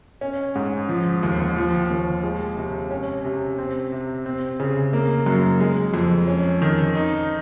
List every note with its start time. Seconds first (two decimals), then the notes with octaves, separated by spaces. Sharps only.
0.21 C#4
0.55 G#2
0.89 F3
1.23 D#2
1.56 F3
1.90 D#2
2.23 G#3
2.57 C3
2.91 C#4
3.25 C3
3.59 C4
3.92 C3
4.26 C4
4.60 C#3
4.93 A#3
5.26 F#2
5.60 G#3
5.94 F2
6.28 C#4
6.62 D#3
6.95 D#4